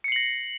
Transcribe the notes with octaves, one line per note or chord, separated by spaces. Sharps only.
A#6 C7 C#7 F#7